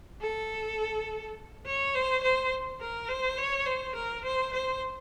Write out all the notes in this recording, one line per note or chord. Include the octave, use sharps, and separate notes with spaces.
A4
C#5
C5
C5
A#4
C5
C#5
C5
A#4
C5
C5